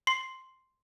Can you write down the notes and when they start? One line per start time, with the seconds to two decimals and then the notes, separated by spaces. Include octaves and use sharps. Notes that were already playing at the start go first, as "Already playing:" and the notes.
0.07 C6 C7